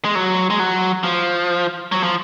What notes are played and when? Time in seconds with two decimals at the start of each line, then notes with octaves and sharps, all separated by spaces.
0.05 G#3
0.15 F#3
0.50 G#3
0.60 F#3
1.04 F3
1.92 F#3
2.03 F3